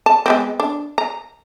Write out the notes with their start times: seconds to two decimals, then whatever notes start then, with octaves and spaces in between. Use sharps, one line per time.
0.06 A5
0.26 G#3 B3 C4
0.60 D4
0.98 A#5